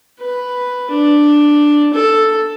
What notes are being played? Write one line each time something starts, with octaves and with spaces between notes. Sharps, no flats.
B4
D4
A4